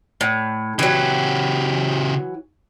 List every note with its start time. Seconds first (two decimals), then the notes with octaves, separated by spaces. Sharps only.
0.21 A2
0.79 C#3 E3 F#3 G4